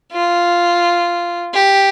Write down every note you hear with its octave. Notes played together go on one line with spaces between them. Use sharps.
F4
G4